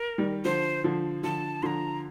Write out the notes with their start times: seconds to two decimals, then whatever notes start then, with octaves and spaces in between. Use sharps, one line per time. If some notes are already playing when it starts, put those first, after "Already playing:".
Already playing: A#4
0.18 D#3 G3
0.44 D3 F3 C5
0.84 D3 F3
1.23 D3 F3 A5
1.63 D3 F3 A#5 C6